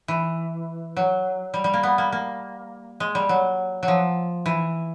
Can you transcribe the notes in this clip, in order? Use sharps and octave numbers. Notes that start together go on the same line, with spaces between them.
E3
F#3
G3
G3
A#3
B3
A#3
A#3
G#3
G3
F#3
F#3
F3
E3